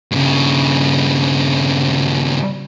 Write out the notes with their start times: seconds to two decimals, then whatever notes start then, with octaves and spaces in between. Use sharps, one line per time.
0.11 G2 C#3